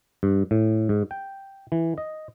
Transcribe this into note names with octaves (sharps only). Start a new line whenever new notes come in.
G2
A2
G#2
G5
E3
D#5